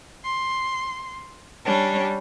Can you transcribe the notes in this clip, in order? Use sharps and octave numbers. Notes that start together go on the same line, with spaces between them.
C6
G3 C#4 D4